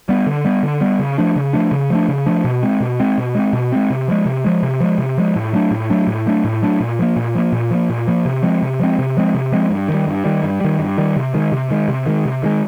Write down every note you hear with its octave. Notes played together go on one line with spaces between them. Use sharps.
G3 B3
D3
G3 B3
D3
G3 B3
C#3
F3 A3 D4
C#3
F3 A3 D4
C#3
F3 A3 D4
C#3
F3 A3 D4
B2
G#3 C4
B2
G#3 C4
B2
G#3 C4
B2
G#3 C4
C3
F3 G#3
C3
F3 G#3
C3
F3 G#3
C3
F3 G#3
A2
F#3 A3 D4
A2
F#3 A3 D4
A2
F#3 A3 D4
A2
F#3 A3 D4
A#2
F3 A#3
A#2
F3 A#3
A#2
F3 A#3
A#2
F3 A#3
C3
F3 G#3 C4
C3
F3 G#3 C4
C3
F3 G#3 C4
C3
F3 G#3 C4
G2
D#3
G3
G2
D#3 G3
G2
D#3 G3
G2
D#3 G3
C3
D#3 G#3
C3
D#3 G#3
C3
D#3 G#3
C3
D#3 G#3